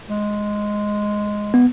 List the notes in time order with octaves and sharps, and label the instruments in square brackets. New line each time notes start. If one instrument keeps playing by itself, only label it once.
[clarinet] G#3
[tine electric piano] B3